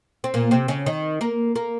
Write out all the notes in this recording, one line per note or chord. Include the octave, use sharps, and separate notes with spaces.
C4
A#2 A#3
C3 C4
C#3 C#4
D#3 D#4
A#3 A#4
A#3 A#4